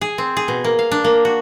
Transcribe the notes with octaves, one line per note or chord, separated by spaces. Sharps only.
G#4
C4
G#4
B2
A#3
F5
D4
A#3
F#4